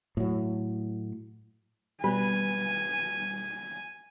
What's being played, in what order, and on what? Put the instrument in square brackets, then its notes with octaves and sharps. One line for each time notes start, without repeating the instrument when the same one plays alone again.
[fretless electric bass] A2 F#3
[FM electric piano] B2 G3 [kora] B4 [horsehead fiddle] G#5